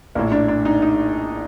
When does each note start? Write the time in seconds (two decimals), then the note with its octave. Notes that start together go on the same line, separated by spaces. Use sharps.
0.15 A#1 A#3
0.19 A2
0.32 D4
0.48 D4
0.65 D#4
0.82 D#4